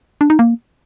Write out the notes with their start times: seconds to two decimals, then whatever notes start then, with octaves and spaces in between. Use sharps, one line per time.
0.21 D4
0.30 D#4
0.39 A#3